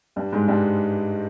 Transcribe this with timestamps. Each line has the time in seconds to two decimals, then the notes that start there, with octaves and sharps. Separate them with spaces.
0.16 G2 G3
0.32 G#2 G#3
0.48 G2 G3